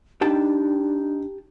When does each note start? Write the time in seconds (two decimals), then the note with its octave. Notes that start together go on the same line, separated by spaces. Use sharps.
0.21 D4 D#4 G4 G5 A5